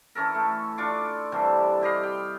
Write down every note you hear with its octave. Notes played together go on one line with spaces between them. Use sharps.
E3 C#4 A4 A#4
A3
D4 F4 C#6 D6
C3 E3 G3 A4
E4 G4 D#5 F5
G5